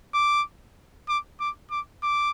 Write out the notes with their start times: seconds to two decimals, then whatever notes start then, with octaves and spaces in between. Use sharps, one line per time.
0.14 D6
1.09 D6
1.40 D6
1.71 D6
2.03 D6